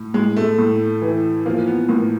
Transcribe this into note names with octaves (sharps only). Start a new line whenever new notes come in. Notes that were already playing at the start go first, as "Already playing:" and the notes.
Already playing: A2
A2 G#3
A3
A2
E3
F3 A#3
B3
A2 A#3